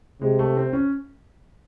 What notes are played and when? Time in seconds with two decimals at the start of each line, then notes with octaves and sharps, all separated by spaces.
0.22 C3 G#3
0.39 A3
0.57 C4
0.73 C#4